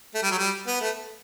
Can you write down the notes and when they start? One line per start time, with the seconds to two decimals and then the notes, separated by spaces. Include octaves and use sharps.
0.14 A3
0.23 G3
0.31 F#3
0.39 G3
0.67 B3
0.81 A3